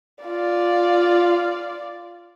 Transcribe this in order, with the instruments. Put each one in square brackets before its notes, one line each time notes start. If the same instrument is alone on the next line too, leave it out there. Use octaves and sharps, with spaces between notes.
[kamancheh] F4 D5